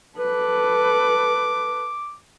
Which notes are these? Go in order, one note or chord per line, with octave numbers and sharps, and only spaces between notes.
A4 B4 D6